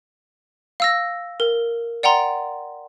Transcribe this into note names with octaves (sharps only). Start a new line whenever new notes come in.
F5 E6 A#6
A#4
D5 F#5 G5 A#5 C6